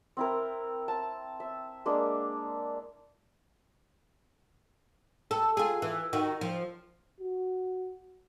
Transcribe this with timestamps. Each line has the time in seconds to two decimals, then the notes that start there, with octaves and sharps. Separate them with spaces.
0.17 C4 E4 A#4
0.88 A5
1.40 E5
1.86 G#3 A#3 D4
5.31 A4
5.57 F4 G#4
5.82 E3
6.13 D#3 F#4
6.41 F3
7.20 F#4